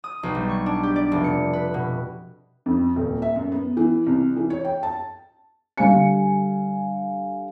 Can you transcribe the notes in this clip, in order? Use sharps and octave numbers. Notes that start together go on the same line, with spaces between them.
D#6
B1
G3
C#6
D4
G4
D5
F1
C#7
B4
B2
F2
D#1
E5
F#2
B3
E3
C2
E3
C#5
G5
A5
D3 G3 F5 G#5 C#7